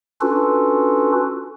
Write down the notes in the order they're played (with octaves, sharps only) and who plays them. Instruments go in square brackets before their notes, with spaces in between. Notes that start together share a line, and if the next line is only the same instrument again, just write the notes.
[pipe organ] C#4 D4 F4 F#4 A4 B4